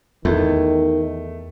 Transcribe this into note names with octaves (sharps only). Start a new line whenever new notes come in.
E2 D#3 A3